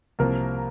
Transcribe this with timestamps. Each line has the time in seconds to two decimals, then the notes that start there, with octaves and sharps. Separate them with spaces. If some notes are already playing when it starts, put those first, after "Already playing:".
0.19 C2 C3 F3 A#3 A#4